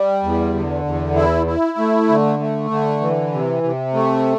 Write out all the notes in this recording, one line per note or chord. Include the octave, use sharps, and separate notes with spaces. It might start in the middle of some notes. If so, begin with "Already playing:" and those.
Already playing: G3
E2
D3
E2
E4
E4
A3
D3
A3
D3
E3
C3
C3
A3